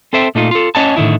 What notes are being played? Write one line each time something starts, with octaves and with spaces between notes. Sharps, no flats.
C4 A4 C5 E5 G5
A#2 A3 D#4 F4
F4 A4
C#4 C#5 D#5 F#5 G#5 A5
A2 D3 D#3 E4